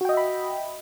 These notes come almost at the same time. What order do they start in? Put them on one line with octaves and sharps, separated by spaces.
F#4 G5 D#5 E5 B5